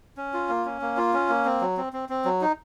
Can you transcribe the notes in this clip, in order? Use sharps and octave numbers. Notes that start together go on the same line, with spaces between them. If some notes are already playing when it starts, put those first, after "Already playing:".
C#4
F4
A#3
C#4
A#3
F4
C#4
A#3
C4
F#3
C4
C4
C4
F#3
D#4